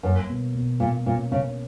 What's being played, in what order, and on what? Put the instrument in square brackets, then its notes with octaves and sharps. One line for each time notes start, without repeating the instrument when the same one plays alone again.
[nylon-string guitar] F#2 [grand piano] A#3
[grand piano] B2
B2
[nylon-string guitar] A#2 [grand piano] A#3
[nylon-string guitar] A#2 [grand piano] C#4
[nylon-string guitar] C#3 [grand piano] C#4